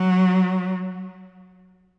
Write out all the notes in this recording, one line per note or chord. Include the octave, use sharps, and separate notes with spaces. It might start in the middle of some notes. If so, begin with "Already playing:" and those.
Already playing: F#3